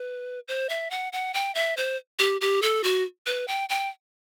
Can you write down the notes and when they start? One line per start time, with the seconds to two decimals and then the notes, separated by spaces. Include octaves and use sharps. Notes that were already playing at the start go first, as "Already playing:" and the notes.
Already playing: B4
0.48 C5
0.69 E5
0.91 F#5
1.13 F#5
1.34 G5
1.55 E5
1.77 C5
2.19 G4
2.41 G4
2.62 A4
2.84 F#4
3.26 B4
3.48 G5
3.69 G5